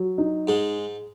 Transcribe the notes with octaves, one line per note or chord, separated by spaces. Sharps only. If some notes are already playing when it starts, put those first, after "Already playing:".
Already playing: F#3
D#4
G#2 G#3 G#4